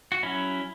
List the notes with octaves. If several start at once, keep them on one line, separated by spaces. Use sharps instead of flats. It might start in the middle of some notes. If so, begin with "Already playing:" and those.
F#4
F#3 C#4 E4